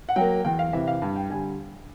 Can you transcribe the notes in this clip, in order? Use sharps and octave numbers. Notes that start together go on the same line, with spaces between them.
F#5
F#3 A#3 G5
E2 G5
F5
C3 E3 E5
F5
G2
G5
D3 G3 G#5